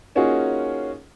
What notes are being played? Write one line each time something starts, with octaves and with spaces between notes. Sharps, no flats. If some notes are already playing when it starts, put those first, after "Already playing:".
A#3 C#4 D#4 F4 F#4 G#4